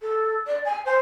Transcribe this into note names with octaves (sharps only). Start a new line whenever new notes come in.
A4
D5
G#5
C5